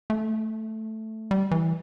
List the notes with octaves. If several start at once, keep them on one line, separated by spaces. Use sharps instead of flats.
A3
G3
E3